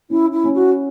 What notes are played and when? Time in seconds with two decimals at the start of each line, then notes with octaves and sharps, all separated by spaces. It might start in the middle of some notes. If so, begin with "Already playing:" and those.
0.10 C#4 E4
0.33 E4
0.44 C#4
0.54 F#4